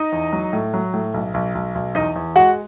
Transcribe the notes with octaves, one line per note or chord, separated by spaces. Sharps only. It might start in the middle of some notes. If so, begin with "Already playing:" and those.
Already playing: D#4 D#5
E2
F#3
A2
F#3
A2
B1
B1
B1
B1
E2 D#4 D#5
E2
G#3 F#4 F#5